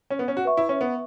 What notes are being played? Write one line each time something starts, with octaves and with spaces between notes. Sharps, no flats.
C#4
B3
C#4
F#4
B4 E5 C#6
E4
C#4
B3